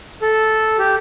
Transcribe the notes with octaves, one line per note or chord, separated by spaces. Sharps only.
A4
G4